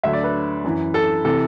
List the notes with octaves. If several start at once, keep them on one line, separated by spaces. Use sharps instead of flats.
D2 D3 F#3 E5
D5
B4
F#2 E3
A4
C3 E3 A4